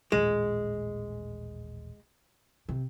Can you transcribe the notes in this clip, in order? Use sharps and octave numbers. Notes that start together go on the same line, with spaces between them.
D#1 A1 G#3
C3